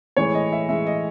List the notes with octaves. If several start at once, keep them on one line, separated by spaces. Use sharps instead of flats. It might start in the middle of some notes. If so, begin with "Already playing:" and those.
A2 E3 G#3 C#5
D#5
E5
A2 E3 G#3 E5
D#5